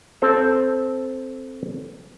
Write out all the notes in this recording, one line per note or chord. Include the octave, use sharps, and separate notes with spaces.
C4 A4 C5